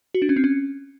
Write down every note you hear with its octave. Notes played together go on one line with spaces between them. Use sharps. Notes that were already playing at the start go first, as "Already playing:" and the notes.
F#4
D4
C#4
C4
C#4